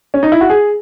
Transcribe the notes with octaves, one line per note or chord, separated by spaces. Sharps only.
C#4
D#4
E4
F#4
G#4